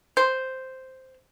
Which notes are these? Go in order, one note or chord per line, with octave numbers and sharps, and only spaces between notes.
C5